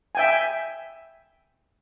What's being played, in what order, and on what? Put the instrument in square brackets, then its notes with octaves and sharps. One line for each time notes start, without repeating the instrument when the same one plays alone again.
[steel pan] E5 G5 G#5